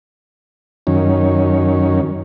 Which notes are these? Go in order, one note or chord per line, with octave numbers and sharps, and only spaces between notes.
F#2 D#3 C#4